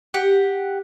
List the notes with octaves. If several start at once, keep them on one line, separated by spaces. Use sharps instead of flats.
G4 F#5